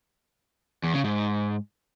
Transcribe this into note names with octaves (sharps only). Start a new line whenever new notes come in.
E2
C#3
G#2